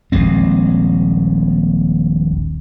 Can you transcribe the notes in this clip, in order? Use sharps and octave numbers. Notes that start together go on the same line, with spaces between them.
D#1 A#1 G#3 C4